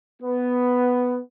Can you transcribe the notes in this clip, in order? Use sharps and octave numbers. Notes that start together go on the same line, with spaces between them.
B3